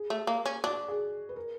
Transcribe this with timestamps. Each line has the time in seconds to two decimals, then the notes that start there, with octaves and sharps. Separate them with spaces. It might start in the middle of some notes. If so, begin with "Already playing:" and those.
Already playing: G#4
0.10 A3
0.27 A#3
0.46 C#4
0.64 D4 F#4
0.88 G#4
1.29 B4
1.36 A#4